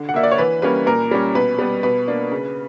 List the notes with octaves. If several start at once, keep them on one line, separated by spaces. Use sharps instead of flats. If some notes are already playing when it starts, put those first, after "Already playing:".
Already playing: D3
F#5
A#3 D4 E5
D5
C#5
E3 B4
G3 A#3 C#4 B4
A#2 A#4
G3 C#4
B2 B4
G3 B3
B2 B4
A#3 D4
C#3